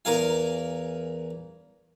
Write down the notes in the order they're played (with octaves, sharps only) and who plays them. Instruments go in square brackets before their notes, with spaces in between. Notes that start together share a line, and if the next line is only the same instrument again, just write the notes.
[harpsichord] E2 A#4 F5 G#5